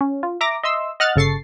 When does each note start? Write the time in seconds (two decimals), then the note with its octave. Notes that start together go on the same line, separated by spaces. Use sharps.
0.01 C#4
0.23 F4
0.41 E5 A#5 D6 A#6
0.63 D#5 E5 C6 E6
1.00 D#5 F#5 F6 F#6 A6
1.16 G1 C#3 A4 C#6 A6 C7